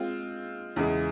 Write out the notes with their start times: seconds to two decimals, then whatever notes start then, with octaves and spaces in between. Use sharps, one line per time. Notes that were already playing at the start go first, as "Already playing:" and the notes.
Already playing: G#3 C4 F4
0.76 E2 C#3 E3 G#3